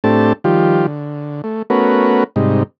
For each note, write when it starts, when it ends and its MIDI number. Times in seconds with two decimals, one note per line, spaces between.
0.04 0.33 45
0.04 0.33 57
0.04 0.33 60
0.04 0.33 62
0.04 0.33 67
0.04 0.33 81
0.44 0.86 51
0.44 0.86 53
0.44 0.86 55
0.44 0.86 65
0.44 0.86 67
0.87 1.42 50
1.44 1.62 57
1.70 2.24 57
1.70 2.24 59
1.70 2.24 61
1.70 2.24 66
1.70 2.24 70
1.70 2.24 71
2.36 2.63 44
2.36 2.63 48
2.36 2.63 55
2.36 2.63 63